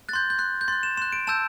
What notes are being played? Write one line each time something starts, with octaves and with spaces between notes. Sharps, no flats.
C6 F#6 G6 A6
G6
C6 F#6
G6
C6 F#6 A6
E7
C6 F#6 E7
D7
A5 E6 G6 E7